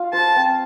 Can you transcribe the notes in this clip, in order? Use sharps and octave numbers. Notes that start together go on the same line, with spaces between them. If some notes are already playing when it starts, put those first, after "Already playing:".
Already playing: F4 F5
C5 A5
C4